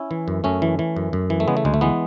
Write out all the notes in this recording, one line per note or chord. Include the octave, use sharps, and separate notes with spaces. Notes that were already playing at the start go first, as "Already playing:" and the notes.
Already playing: C#4 E4
E3
F#2
F#2 A3 C#4
E3
E3
F#2
F#2
E3
A3
C#3 G#3 B3
A3
D2 G#3
A3
E3 G#3 B3